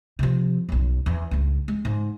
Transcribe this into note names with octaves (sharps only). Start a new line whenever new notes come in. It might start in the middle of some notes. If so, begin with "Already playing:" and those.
C3 F3
B1 F#2
E2
C#2 G2
G#3
G#2